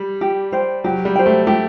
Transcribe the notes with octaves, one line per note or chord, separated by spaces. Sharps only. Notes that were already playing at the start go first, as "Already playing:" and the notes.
Already playing: G3
G4
C5 G5
F#3 G4
G3
C5 G5
A3
A3 G4